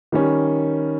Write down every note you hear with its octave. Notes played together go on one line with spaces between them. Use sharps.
D#3 G3 C#4